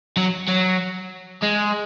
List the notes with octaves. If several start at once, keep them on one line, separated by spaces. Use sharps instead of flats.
F#3
F#3
G#3